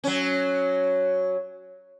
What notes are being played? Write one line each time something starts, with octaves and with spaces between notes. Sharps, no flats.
F#3 C#4